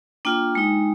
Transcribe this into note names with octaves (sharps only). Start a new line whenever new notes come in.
A#3 D4 F4 G5
G#3 D#4